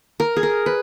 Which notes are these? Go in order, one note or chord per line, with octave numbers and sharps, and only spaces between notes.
A#4
G#4
A#4
B4